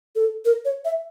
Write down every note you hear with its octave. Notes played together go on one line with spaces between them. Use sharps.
A4
A#4
C#5
E5